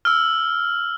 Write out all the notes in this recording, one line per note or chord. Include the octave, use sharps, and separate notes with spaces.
E6 F6